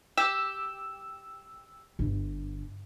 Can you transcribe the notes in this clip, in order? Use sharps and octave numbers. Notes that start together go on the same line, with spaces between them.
G4 E6
G1